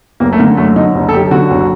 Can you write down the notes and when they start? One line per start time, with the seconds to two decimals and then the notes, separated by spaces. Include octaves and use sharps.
0.20 F#1 A#3
0.32 A3
0.39 D3 A#3
0.57 F#2 A3
0.76 D3 D#4
0.94 F#1
1.09 A4
1.12 F#2 G4
1.31 D3 F#4
1.50 F#1